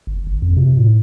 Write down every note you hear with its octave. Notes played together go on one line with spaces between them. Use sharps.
G1
G#1
F2
C3
A2